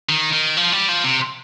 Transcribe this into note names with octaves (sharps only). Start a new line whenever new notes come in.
D#3
D#3
F3
G3
F3
C3